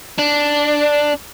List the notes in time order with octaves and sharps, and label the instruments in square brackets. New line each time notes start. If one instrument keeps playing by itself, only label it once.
[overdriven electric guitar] D4